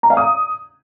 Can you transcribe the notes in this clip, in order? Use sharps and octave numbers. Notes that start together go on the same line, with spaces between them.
A#5
F5
D#6